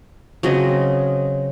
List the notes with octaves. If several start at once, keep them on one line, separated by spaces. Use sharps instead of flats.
C#3 F#3 C4 D#5